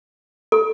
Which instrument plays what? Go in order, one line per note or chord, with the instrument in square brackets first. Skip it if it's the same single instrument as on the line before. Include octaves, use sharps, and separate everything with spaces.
[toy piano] A4